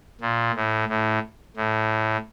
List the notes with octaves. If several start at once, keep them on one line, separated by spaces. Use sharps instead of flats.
A#2
A2
A2
A2